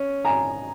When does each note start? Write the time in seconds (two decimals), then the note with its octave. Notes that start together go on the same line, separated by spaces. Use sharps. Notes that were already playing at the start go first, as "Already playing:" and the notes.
Already playing: C#4
0.25 G#5 A#5